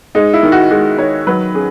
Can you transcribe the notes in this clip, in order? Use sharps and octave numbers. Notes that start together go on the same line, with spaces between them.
G#3 D#4
E4
D#3
F#4
G#3 F#4
D#3 C#5
F#3 B4
C#4 G#4